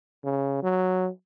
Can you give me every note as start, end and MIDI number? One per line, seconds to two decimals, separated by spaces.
0.24 0.58 49
0.63 1.09 54